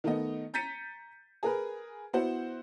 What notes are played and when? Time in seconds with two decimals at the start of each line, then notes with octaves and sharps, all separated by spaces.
0.04 D#3 A3 B3 D#5
0.54 A#5 G6 A6 B6 C#7 D#7
1.43 G#4 A#4 B4
2.13 B3 E4 F#4 C5 F#5